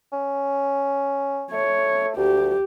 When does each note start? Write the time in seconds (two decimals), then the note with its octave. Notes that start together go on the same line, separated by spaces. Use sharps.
0.13 C#4
1.52 A3 C#5
2.17 D2 G4